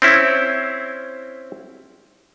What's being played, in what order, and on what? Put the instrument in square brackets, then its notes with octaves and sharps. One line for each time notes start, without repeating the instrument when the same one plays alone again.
[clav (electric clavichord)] C4 C#4 E4